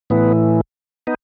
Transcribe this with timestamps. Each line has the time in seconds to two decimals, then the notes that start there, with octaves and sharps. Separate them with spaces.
0.10 A2 E3 B3
1.07 B3 D#4